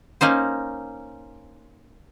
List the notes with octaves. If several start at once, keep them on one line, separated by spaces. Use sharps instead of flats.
A#3 C#4 D#4 C5